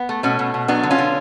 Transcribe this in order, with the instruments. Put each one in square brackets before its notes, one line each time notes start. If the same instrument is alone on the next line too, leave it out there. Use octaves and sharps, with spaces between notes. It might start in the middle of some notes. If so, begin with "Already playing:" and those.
Already playing: [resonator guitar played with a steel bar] B3
A3
B2 A3 C#4
B2
B2
F#3 B3 D4
D3
C#4 F4
D3